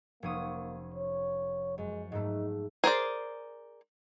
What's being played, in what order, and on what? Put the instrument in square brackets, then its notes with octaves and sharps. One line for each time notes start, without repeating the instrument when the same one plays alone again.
[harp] F1 C#4 D#6 [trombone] A#3
[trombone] C#5
[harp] F#2 [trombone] G#3
[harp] G#2 A3 [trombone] D#4
[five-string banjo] G#4 A#4 C5 D5